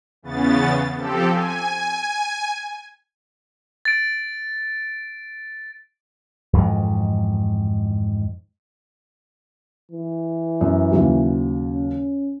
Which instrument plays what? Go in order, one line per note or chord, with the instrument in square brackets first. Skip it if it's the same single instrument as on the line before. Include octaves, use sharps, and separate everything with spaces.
[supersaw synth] E2 C#3 B3 A6
F3 C4 G4 A4
G#5
[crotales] A6 D7
[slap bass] F2 G#2 D#3 E3
[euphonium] E3
[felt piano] F#2
D#2 C#3 F#3
[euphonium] C#4